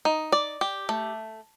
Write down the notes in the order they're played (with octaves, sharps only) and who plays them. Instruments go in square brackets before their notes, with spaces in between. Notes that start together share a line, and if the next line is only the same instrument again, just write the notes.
[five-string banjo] D#4
D5
G4
A3